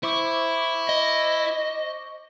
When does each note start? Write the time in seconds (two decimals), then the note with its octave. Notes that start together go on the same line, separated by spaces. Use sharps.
0.03 E4 C5 C#6 D6
0.89 D#5